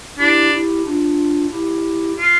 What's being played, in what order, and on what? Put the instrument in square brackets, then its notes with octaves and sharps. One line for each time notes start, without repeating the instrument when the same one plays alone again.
[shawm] D4 [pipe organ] E4 G4
[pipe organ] E4 G4
D4 F4
E4 G4
[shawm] F4